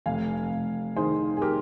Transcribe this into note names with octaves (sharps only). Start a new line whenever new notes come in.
F1 F5 G#5
F1
D#3 G#4 C5
G#4
G4 A#4